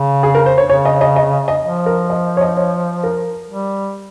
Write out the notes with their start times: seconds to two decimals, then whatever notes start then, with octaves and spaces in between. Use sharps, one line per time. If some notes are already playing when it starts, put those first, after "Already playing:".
Already playing: C#3
0.23 G#4
0.35 A#4
0.46 C5
0.58 C#5
0.69 C#3 C#5
0.85 D#5
1.01 D#5
1.16 D#5
1.48 D#5
1.64 F3
1.86 A#4
2.10 D#5
2.37 C#5
2.41 D#5
2.57 C#5
3.03 A#4
3.50 G3